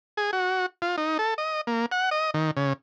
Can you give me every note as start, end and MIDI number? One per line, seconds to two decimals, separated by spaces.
0.17 0.31 68
0.33 0.66 66
0.82 0.96 65
0.98 1.18 63
1.19 1.34 69
1.38 1.61 75
1.67 1.86 58
1.91 2.10 78
2.11 2.31 75
2.34 2.51 51
2.57 2.73 49